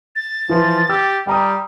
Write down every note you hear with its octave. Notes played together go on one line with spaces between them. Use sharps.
A6
E3 F3
G4 E6
G3 G5 A#5 D#6